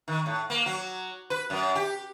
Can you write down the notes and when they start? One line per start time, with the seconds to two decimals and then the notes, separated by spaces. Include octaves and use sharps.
0.08 D#3
0.26 A2
0.50 A#3
0.66 F#3
1.30 B4
1.50 F#2
1.75 G4